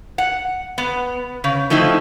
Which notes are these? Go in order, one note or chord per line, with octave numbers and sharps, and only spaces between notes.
F#5
B3
C#3
F3 A3 C4 D#4 E4